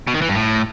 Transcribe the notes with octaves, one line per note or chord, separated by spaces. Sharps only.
B2
D#3
E3
G2
A2